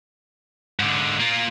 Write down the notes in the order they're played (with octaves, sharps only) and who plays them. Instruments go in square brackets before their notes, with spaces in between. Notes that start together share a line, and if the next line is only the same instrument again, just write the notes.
[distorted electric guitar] G#2 D3
A#3 F4